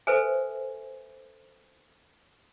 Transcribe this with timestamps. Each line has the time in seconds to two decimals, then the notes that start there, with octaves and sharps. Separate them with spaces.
0.07 A4 B4 C5 E5 G#5